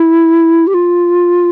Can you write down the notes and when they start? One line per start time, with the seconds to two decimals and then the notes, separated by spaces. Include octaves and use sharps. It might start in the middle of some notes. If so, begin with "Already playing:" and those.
Already playing: E4
0.67 G4
0.74 F4